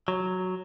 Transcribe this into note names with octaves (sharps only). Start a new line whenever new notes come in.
F#3